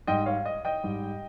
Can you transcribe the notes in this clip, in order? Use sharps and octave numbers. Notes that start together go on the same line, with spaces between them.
G#2 G3 D#5 G5
C#5 F5
D#5
D#5 G5
G#2 G3